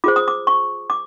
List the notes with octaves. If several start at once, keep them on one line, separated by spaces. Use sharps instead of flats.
F4 G#4 C5 D6
D#6
D6
C#6
D6